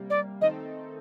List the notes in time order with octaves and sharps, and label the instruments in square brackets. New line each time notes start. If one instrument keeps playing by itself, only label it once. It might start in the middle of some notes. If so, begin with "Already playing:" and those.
Already playing: [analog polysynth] C3 G3 A#3
[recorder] D5
[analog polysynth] D#3 A3 C4 D#4 A4 [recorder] D#5